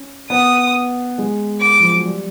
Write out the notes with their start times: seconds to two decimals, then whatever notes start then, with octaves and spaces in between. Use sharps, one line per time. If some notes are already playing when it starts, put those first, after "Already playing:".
Already playing: C#4
0.30 B3 D#6
1.18 G#3
1.61 D6
1.80 F3
1.93 F#3
2.05 G3